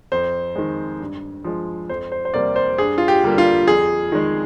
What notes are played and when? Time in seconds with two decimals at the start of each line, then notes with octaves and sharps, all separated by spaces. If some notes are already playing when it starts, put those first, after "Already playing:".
0.12 F2 C5
0.56 D#3 G#3
1.00 G2
1.45 F3 G#3
1.89 F2 C5
2.12 C5
2.25 C5
2.34 C3 G3 A#3 D5
2.56 C5
2.78 G2 G#4
2.98 F4
3.08 G4
3.24 D3 G3 A#3
3.38 F4
3.68 F2 G#4
4.12 D#3 G#3